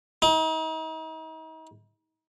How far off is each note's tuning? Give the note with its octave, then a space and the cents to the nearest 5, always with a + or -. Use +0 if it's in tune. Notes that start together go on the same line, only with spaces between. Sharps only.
D#4 +40